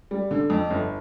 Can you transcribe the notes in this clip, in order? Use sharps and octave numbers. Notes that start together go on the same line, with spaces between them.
G3
D3
F2
G1